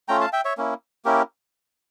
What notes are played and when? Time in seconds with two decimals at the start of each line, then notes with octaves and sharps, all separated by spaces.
0.08 A3 C#4 F4 G5 A#5
0.20 F5 A5
0.33 E5 G5
0.45 C#5 E5
0.57 A#3 C#4 E4
1.05 A#3 C#4 E4 G4 A#4